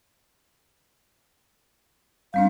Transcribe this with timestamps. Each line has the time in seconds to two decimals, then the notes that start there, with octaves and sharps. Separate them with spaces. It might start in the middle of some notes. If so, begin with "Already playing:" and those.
2.34 G3 C4 D4 F5